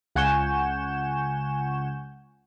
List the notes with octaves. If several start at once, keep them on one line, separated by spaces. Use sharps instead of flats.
C#2 F#5 G#5 C#6 G6 E7